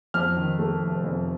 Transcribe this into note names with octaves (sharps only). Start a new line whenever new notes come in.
F2 F6
D#3
A3
F1
F2